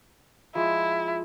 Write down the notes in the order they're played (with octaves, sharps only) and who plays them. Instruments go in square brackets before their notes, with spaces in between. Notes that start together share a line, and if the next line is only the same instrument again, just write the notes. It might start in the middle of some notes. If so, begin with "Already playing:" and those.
[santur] F3 G#3 [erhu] E4